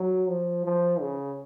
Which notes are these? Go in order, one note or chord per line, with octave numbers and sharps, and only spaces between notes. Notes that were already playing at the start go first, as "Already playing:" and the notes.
Already playing: F#3
F3
F3
C#3